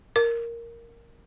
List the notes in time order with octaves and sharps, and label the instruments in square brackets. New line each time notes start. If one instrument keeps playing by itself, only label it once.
[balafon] A#4